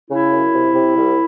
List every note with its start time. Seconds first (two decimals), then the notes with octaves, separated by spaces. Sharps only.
0.09 C#3 E4
0.31 F#2
0.53 C3
0.75 C3
0.97 C2